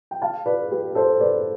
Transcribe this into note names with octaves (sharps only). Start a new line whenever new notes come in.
G5
F5 A5
B4 D5
G4 B4
A4 C5
B4 D5